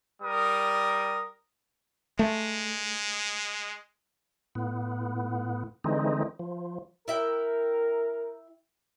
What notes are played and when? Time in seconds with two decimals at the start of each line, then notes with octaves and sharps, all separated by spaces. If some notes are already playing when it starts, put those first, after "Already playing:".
0.22 G3 A#4 D#6
2.19 G#3 A3
4.55 A2 B3
5.84 D3 E3 G#3 C4 D#4
6.39 F3
7.08 E4 A#4 E5 G5